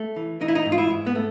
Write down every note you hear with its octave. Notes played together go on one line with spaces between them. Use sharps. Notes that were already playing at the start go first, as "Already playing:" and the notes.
Already playing: A3
E3
E3 D#4
E4
D#4
G#2
F4
E4
G#2
B3
A3